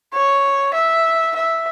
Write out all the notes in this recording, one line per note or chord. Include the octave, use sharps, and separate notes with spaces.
C#5
E5
E5